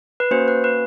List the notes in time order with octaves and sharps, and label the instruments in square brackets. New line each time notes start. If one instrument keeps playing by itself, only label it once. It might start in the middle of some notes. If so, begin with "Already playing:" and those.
[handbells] B4
A#3 C#4 F#4 C5
B4
B4